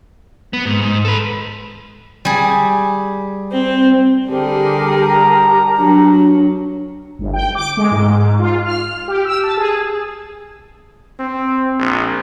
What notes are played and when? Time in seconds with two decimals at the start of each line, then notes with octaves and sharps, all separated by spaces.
0.53 B3
0.65 G#2
0.81 G#2
1.05 A4 B4
2.25 G3 G#4
3.53 C4
4.28 D3 G3 G4 G#4 A#4 A5
4.92 A#5
5.78 F#3 D4
7.19 G1
7.33 G5
7.55 D6
7.77 G#3
7.91 G#2
8.18 G#2
8.39 F4
8.64 F6
9.08 G4
9.25 E6
9.43 A5
9.57 G#4
11.19 C4
11.79 A#1